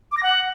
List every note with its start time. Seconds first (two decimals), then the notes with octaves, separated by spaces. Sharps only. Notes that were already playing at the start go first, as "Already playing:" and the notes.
0.12 D6
0.17 A#6
0.23 F#5